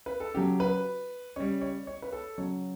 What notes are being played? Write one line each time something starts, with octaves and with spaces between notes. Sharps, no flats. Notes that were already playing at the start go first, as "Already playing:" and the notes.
B4
A4
C#3 F#3 G4
B4
C#3 G3 C#5
C#5
C#5
B4
A4
C#3 F#3 C#5